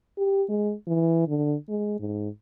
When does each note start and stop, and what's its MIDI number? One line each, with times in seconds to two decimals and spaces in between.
0.18 0.44 67
0.49 0.73 56
0.87 1.26 52
1.28 1.55 50
1.69 1.97 56
2.00 2.28 44